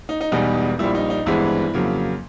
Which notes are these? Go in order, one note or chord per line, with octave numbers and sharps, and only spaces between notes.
D#4
D#4
E1 E2 B2 G3 B3 D#4
A#1 A#2 G3 A#3 E4
D#4
D#4
G#1 G2 E3 G#3 B3 E4
F2 C#3 F#3 A#3